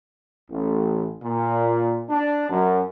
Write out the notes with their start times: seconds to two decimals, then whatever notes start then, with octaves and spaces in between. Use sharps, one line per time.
0.50 A1
1.22 A#2
2.09 D4
2.50 F#2